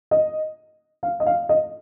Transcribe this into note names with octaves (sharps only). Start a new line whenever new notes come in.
D#5
F5
D#5
F5
D#5